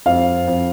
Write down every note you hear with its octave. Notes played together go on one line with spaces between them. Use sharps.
F2 F5
F2